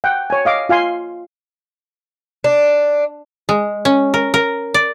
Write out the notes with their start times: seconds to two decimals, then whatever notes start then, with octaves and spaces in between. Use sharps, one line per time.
0.04 F#5 G5
0.30 C#5 G#5
0.45 D#5 F5 D6
0.69 F4 F5 G#5 C6
2.44 D4
3.49 G#3
3.85 C#4
4.14 A#4
4.34 A#4
4.74 D5